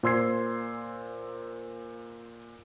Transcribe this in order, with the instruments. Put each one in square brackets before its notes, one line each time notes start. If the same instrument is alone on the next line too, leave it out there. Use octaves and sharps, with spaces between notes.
[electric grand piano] A#2 C5 C6 E6 G#6 C7